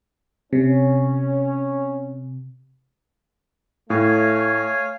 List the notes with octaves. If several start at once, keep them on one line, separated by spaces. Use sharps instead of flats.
C3 C#4
A2 A3 C#5 F5 G#5